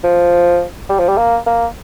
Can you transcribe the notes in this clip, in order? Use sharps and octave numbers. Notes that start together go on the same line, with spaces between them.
F3
G3
F3
G3
A#3
A#3